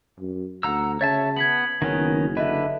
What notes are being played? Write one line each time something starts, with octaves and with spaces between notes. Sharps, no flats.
F#2
D2 F#5 A#5 E6
C#3 C#5 E5 A5 A6
B3 G#6 B6 F#7
F#1 D#3 B3 C#4
D3 B4 D#5 E5